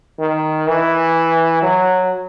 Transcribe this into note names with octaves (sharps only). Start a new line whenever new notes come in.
D#3
E3
F#3